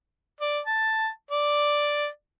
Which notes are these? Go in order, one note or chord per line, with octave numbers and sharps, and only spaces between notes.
D5
A5
D5